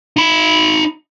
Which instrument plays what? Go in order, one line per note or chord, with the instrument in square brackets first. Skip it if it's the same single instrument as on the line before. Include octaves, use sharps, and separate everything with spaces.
[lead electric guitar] D#4 B5